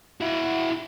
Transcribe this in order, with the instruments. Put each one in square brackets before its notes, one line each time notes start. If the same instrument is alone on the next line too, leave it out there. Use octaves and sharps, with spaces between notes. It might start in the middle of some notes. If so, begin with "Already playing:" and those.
[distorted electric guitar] E4 F#4